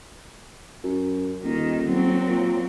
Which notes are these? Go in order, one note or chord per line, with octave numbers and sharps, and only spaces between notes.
F#2
D#1 D#3
F#3 C4
A#2